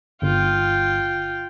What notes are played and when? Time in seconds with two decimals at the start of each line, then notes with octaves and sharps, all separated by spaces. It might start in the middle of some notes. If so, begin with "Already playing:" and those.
0.22 G1 F4 G5